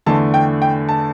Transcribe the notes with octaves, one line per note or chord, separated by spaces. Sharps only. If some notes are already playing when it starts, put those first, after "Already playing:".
E2 D3 A3 A5
G5
G5
A5